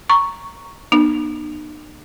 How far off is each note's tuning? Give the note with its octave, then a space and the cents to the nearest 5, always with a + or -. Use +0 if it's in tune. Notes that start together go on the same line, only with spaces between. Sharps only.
A#5 +0 C#6 +0
B3 -30 D#4 -45